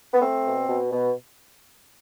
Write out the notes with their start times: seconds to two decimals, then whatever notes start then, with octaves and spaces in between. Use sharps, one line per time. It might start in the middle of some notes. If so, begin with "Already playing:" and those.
0.14 B3
0.20 A3 C4
0.45 B2
0.68 B2
0.92 B2